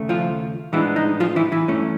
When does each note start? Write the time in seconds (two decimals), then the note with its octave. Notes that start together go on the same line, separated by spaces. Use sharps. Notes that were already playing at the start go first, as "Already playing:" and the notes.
Already playing: D#2 C#3 A3
0.09 F3 F4
0.72 A2 E3 F3 G#3 B3 D4 E4
0.96 D#4
1.20 F3 F4
1.36 E3 E4
1.52 E3 E4
1.68 G2 E3 A3 C#4